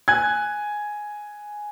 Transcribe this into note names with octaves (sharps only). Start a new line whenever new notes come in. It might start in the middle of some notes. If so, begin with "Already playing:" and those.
G#5 F#6 G#6